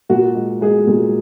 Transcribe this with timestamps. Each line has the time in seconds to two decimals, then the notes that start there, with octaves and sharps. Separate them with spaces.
0.09 A#2 F#4
0.35 G#3
0.61 G#3 G#4
0.87 A#2